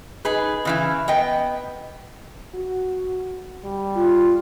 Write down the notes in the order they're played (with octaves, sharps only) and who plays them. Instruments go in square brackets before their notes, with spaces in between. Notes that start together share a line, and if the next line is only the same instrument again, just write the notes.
[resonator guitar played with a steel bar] D#4 G#4 B4
C#3 E3 E4
B3 D#5 G5
[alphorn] F#4
G3
[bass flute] F4